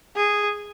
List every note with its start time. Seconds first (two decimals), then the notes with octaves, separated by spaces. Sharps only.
0.16 G#4